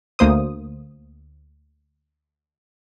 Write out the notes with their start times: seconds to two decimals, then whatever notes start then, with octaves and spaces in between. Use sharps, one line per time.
0.19 D2 A#3 C5 D#6